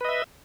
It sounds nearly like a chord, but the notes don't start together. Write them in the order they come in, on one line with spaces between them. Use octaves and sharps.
B4 D#5 E5